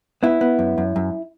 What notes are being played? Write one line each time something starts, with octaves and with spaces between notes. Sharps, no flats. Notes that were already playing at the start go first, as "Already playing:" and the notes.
B3 E4
B3
F#2
F#2
F#2